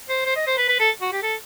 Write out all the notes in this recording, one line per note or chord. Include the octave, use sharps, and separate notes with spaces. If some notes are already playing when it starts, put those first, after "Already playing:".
C5
C5
D#5
C5
B4
B4
A4
F#4
G4
A4